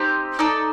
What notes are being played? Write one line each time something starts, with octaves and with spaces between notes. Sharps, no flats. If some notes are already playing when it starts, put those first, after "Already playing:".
Already playing: C4 D#4 G4
D#4 A4 D5